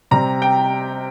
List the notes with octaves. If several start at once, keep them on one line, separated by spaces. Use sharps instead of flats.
C3 G3 C4 A#5
G5